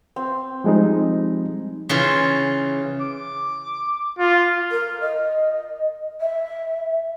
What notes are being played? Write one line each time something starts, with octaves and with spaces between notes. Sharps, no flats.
C4
F3 G3 G#3 C4 D#4
C#3 E3 F4
D6
F4
A#4
D#5
E5